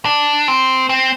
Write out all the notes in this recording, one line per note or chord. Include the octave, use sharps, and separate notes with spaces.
D4
C4
C4